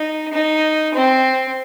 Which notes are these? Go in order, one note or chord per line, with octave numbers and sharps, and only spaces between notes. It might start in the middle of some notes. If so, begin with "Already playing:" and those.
Already playing: D#4
D#4
C4